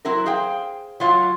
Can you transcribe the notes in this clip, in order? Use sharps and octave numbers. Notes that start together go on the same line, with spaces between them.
F#3 C4 E4 F#4 A#4
G#4 C5 F5 G5
F#3 F4 F5